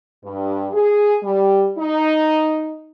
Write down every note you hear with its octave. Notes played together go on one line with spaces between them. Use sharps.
G2
G#4
G3
D#4